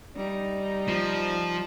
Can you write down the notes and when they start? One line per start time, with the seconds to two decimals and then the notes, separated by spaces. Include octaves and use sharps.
0.16 G3 D#4
0.89 F3